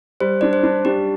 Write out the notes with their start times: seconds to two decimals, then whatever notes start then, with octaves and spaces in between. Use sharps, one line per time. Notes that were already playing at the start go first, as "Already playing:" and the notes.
0.20 G3 C5
0.41 D4 D5
0.53 C5
0.63 D4
0.85 D4 G4